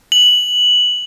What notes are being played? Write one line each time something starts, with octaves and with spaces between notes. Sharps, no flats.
F#7